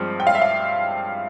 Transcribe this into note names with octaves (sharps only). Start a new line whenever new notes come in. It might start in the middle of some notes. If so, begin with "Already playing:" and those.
Already playing: G2 F3 G#3 C4
G5
F5
E5
F5